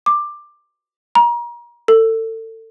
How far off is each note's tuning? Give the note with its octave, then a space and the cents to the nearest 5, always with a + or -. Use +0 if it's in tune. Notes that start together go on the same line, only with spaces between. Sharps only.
D6 +15
A#5 +35
A4 +30